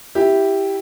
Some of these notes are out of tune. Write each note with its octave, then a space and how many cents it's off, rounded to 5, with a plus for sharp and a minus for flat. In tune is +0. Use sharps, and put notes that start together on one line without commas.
E4 +0 G4 +0